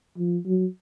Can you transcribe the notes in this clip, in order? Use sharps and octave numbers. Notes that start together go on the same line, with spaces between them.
F3
F#3